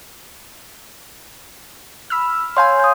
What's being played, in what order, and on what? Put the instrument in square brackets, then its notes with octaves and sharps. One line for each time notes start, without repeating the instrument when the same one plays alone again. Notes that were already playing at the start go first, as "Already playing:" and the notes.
[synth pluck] B5 E6 F6
[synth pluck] C#5 F5 G#5 [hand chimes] C6 G6
[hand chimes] D#6 G6